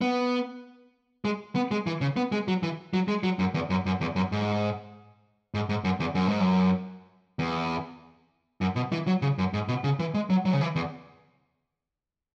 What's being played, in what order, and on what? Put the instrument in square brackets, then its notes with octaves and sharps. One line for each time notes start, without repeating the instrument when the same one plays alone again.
[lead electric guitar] B3
G#3
B3
G#3
E3
C#3
B3
G#3
F#3
E3
F#3
G#3
F#3
F#2
E2
F#2
F#2
E2
F#2
G#2
G#2
G#2
F#2
E2
F#2
G#2
F#2
E2
F#2
B2
E3
F#3
C#3
F#2
G#2
B2
C#3
E3
G#3
F#3
F#3
C#3
E3
E2